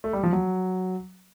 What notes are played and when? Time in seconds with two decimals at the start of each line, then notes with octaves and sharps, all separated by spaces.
0.04 A3
0.13 G3
0.24 F3
0.33 F#3